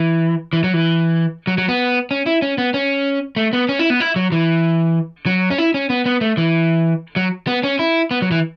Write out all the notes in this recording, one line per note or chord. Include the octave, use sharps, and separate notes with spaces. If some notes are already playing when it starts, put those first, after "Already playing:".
Already playing: E3
E3
F#3
E3
F#3
F#3
B3
C#4
E4
C#4
B3
C#4
A3
B3
C#4
E4
B3
E4
F#3
E3
F#3
C#4
E4
C#4
B3
B3
A3
E3
F#3
B3
C#4
E4
B3
F#3
E3